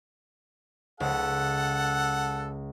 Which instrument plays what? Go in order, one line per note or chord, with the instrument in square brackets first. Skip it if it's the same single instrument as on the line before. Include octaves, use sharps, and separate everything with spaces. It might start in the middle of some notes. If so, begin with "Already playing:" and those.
[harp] C#2 [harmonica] A4 F#5